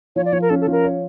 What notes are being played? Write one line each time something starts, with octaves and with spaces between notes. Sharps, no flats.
F3 C#5
D5
F3 C#5
A#4
C#4 A4
A4
F3 A#4
C#5